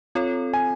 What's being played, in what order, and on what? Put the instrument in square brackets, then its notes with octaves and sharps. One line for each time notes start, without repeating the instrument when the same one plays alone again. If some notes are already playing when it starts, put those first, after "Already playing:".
[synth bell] C4 F4 A4 C#5
[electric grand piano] G#5